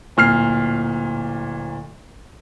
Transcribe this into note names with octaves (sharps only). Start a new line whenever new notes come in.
D1 A#2 F6 C7